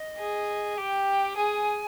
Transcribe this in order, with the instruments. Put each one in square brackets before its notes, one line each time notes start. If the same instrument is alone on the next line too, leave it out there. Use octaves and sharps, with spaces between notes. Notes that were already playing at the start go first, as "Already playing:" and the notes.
Already playing: [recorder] D#5
[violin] G#4
[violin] G4 [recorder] G5
[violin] G#4 [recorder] G#5